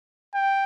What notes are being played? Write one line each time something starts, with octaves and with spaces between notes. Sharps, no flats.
G5